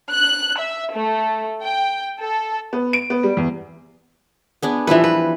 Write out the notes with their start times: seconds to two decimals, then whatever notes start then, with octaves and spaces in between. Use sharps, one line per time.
0.12 F#6
0.59 E5
0.92 A3
1.62 G5
2.19 A4
2.73 B3
2.93 D7
3.10 B3
3.23 G3
3.37 E2
4.62 B3 D4 G#4
4.87 E3 F3 G3 B4 E5
5.04 B4